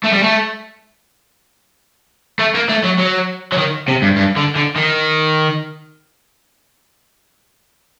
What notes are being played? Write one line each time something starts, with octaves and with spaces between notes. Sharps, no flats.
A3
G3
A3
A3
A#3
A3
F#3
F#3
F#3
D#3
C3
G2
G2
D3
D3
D#3